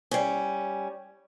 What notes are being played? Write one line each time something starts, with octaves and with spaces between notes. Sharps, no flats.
G3 C#4